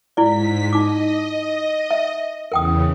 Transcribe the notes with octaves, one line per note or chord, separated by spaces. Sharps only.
G#2 E4 D5 B6
D#4 D#5 D6
E5
E2 C#3 A#4 G5 D#6